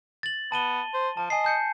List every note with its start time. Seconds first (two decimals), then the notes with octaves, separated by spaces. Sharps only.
0.23 A6 F#7
0.52 B3 A5 D#7 G7
0.94 C5
1.17 F3 A5
1.30 D#5 G#5 C7
1.44 A5 G6 C#7